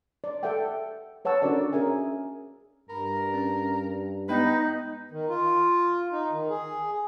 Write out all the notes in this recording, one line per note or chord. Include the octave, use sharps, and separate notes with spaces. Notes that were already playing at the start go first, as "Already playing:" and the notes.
D5
A4 D5 E5 F#5 G5
B4 C#5 F#5 A5 E6
C#4 D4 F#4 A4 A#4 D5
C#4 G#4 A#4 E5 G#5
G2 A#4 B5
C#4
G#3 B3 D#4 B4 G5
D#3
F4
D#4
D#3
G#4